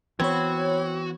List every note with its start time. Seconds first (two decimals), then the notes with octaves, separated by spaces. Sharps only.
0.19 E3 B3 C4 F#4 C#5 B5 G#6